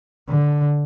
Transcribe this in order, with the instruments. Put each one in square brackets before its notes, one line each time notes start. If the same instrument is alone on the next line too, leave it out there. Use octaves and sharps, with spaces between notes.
[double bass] D3